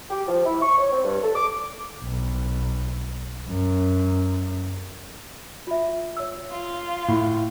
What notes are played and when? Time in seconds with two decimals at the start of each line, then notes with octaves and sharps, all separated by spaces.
0.10 G4
0.28 F3
0.45 E4
0.61 C#6
0.78 C#5
0.92 C4
1.04 G2
1.23 A4
1.35 D6
2.04 B1
3.48 F#2
5.67 F4 E5
6.17 C#5 E6
6.50 F4
7.08 A2